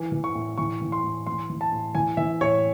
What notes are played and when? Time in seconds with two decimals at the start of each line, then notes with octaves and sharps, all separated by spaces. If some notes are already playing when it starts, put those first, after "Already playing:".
Already playing: E3
0.12 E3
0.24 C#6
0.35 A2
0.58 E3 C#6
0.82 E3
0.92 C6
1.03 A2
1.27 E3 C6
1.50 E3
1.61 A5
1.72 A2
1.95 E3 G#5
2.17 E3 E5
2.41 A2 C#5